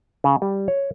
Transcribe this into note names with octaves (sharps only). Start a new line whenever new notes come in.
C#3
G3
C#5